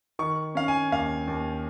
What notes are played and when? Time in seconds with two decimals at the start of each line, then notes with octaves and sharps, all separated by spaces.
0.19 D#3 C#6
0.55 C#4 F5
0.68 G#5
0.92 D#2 F5
1.27 D#2